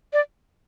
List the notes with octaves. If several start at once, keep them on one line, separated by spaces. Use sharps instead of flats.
D5